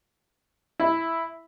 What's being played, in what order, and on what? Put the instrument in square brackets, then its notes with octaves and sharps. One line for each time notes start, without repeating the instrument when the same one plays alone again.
[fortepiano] E4